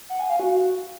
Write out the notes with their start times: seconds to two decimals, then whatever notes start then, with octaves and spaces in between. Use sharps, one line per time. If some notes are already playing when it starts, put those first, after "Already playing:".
0.09 F#5
0.19 G#5
0.29 F5
0.40 F#4